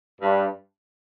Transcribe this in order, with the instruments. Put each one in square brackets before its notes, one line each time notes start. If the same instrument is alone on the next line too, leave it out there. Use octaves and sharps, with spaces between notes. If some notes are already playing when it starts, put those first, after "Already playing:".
[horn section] G2